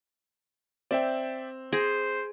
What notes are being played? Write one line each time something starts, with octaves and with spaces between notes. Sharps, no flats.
C4 D5 E5 G5
G#4 C5 A#6 D7